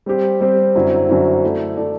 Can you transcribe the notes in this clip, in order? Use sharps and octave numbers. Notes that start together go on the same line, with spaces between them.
G3 C4 G4 C5
G3 C4 G4 C5
F#2 D3 F#3 C4 E4
F#2 D3 F#3 C4 E4
A3 E4 A4 D5
A3 E4 A4 D5